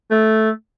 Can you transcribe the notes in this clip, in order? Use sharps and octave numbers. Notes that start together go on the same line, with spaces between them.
A3